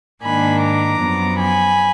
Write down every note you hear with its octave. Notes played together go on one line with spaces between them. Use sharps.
G#2 D#3 A#3 D4 G#5 B5
A#5 D6
F#2 F3 B3
G#5 B5